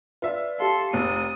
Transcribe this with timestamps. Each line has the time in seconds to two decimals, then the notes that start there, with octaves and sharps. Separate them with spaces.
0.22 F4 B4 D5 E5
0.60 G4 A4 F5 C6
0.93 F1 D#6